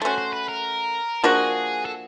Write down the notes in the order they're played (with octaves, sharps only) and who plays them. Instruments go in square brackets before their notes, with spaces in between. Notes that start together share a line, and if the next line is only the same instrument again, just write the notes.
[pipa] A3 C#4 F#4 [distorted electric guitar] C5
[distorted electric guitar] C5
B4
A#4
[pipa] F3 A#3 D4 F#4 [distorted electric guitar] G#4
[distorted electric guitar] A4